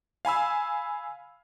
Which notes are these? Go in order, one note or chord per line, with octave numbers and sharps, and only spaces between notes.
F5 G#5 B5 E6